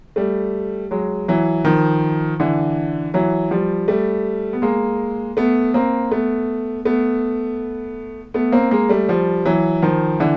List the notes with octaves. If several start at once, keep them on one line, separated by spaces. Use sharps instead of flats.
G3 A3
F#3 G#3
E3 F#3
D#3 F3
D3 E3
E3 F#3
F3 G3
G3 A3
B3
G#3 A#3
A3 B3
A#3 C4
A3 B3
A3 B3
A3 B3
A#3 C4
G#3 A#3
G3 A3
F3 G3
E3 F#3
D#3 F3
D3 E3